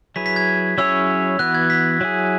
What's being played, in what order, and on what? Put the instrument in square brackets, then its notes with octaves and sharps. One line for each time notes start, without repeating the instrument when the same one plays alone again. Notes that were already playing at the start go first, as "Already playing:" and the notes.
[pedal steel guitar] F#3 E4 G#4 B4 [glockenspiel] B6
[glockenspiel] B6
G#6
[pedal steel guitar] F#3 C#4 E4 G#4 C#5 [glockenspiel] E6
[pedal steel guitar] E3 B3 F#4 B4 [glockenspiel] F#6
[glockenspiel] G#6
B6
[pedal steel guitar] F#3 E4 G#4